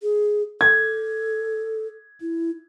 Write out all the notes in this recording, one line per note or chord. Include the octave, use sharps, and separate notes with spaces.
G#4
A4 G#6
E4